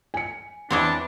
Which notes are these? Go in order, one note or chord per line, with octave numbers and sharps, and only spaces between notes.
G#5 C#7
E2 E3 C4 D4 C#5 D#5